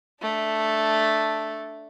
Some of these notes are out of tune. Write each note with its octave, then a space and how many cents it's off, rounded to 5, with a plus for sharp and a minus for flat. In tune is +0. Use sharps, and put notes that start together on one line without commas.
A3 +0 D4 +0